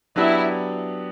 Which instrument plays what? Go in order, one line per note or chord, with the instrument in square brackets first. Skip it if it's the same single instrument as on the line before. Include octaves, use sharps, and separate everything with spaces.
[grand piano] F#3 B3 D4 G4 [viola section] E4